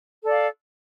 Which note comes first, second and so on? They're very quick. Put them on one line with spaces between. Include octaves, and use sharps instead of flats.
A4 D5 F5